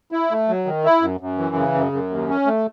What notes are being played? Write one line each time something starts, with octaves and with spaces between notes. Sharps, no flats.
E4
A3
F#3
D#3
E4
F#2
F#2
E3
C#3
F#2
F#2
D#2
C#4
A3